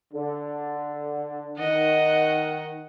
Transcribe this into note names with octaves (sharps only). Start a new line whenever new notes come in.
D3
D#3 D#5 F#5